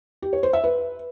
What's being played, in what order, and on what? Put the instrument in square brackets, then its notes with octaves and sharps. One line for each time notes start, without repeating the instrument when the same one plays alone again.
[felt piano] G4
C#5
C5
E5
B4